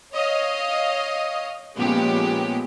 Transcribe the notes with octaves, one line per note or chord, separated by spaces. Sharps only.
C#5 D#5 F5
A#2 F3 G#3 B3 C#4 G4